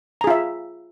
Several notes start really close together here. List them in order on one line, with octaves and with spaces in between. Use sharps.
A#5 G#4 F4 E5